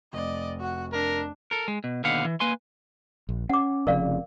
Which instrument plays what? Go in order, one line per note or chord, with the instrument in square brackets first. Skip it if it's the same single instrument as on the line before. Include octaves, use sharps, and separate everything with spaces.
[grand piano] F1 [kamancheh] D5 D#5
[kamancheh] F#4 F#5
[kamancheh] D4 [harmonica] A#4
[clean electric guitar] A4 A#4
G#3
B2
D#2 B2 D3 B4 F5 F#5
E3
A#3 B4 G#5 C6
[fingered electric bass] A#1
[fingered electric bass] C#4 [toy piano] F#5 D6
[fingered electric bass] F1 F2 C#3 [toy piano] A#4 D5 F5